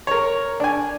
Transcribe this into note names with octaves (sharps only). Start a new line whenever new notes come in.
A#4 C#5
D4 G#5